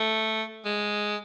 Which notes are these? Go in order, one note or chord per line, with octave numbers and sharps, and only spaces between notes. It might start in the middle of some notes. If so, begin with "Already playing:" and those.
Already playing: A3
G#3